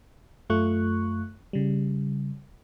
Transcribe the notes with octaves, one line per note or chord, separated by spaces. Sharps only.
F#2 A3 F4 C#6 F#6
C#3 G3